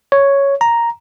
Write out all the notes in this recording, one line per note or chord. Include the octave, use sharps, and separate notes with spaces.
C#5
A#5